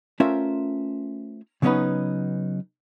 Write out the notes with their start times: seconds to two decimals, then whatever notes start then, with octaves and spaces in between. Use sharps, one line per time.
0.20 A3 C#4 F4 A#4 C5 E5
1.62 C#3 F#3 B3 C#4 D#4 B4